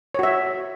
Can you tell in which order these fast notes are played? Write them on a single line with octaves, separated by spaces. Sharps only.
C#5 F#4 E5